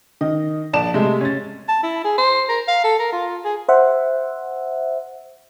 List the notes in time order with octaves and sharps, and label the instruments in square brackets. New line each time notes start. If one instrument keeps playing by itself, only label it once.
[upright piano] D#3 [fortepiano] D#5
[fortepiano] A#1 [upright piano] D5 A5 E7
[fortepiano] C3 A3 [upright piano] G#3
[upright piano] C#4 A6
[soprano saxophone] A5
E4
G#4
C5
A#4
F5
A4
A#4
F4
G#4
[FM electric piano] C5 E5 F#5